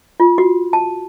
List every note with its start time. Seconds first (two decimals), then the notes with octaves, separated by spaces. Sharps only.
0.20 F4
0.38 F#4
0.73 A5